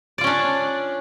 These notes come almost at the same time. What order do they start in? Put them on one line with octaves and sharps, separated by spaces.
D5 F4 C#4 D4